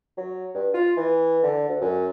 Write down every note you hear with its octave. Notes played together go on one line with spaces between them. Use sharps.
F#3
G2
F4
E3
D3
D2
F#2